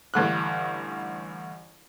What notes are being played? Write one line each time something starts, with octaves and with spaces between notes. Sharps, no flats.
A1 G2 D3 F#6